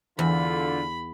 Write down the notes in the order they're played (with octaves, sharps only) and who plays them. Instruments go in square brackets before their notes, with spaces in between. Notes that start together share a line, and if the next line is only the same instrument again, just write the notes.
[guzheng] E2 [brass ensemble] D3 F4 [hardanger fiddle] B5